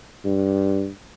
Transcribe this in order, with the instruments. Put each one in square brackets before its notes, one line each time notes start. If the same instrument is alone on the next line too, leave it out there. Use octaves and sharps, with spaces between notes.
[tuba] G2